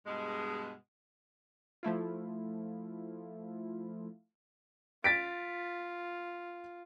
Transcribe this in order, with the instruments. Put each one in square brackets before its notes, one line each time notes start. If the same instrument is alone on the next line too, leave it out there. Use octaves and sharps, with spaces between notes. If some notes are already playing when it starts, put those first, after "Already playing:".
[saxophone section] G2 B2 G#3
[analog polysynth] F3 A3 E4 F4
[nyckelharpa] F4 [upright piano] A6 B6 D7